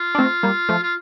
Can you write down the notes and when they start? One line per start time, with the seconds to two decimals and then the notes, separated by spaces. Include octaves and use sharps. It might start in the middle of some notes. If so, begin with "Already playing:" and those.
Already playing: F4
0.15 D4
0.19 A3 C4
0.43 G3 A#3
0.69 F3 A3
0.83 F4